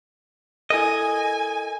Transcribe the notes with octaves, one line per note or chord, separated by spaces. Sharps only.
E4 A4 A#4 D#5 G#5